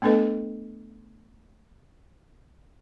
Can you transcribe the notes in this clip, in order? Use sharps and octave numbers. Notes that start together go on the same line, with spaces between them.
A3 B3 D4 A4 B4 D#5